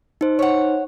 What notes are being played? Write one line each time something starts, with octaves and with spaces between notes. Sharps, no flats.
D#4 C5
C#5 F#5